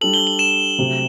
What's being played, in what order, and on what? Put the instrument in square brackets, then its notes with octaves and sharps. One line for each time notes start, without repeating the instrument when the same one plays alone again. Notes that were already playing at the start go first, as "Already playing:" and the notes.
[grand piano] G3 D4 A4 [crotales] F#7
[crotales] G7
F#7
E7
[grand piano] C3 F#3 A3 C4 G4